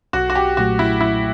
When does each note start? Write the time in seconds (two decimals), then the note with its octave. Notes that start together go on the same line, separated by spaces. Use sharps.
0.13 B1 F#4
0.30 F#4
0.35 G4
0.57 A#2 F#3 A3 F#4
0.79 E4
1.01 B1 E4